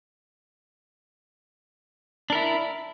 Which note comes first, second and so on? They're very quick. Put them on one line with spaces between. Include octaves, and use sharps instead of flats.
D4 A#4 E4